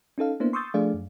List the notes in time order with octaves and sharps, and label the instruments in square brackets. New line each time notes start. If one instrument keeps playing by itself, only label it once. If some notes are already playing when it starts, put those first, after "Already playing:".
[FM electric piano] C#4 D#4 A4 F5
A#3 B3 D4 E4 C5
C6 C#6 D#6 E6 G6 A6
F3 A3 D4 G#4 D5 F5
F#2